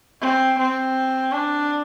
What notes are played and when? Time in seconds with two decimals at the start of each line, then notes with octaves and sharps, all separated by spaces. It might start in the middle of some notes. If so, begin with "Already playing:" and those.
0.21 C4
0.59 C4
1.32 D4